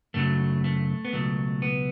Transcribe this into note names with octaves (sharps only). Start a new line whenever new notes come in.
F#2 C#3 F#3 A3
A3
B3
C#2 B2 F#3 A3
B3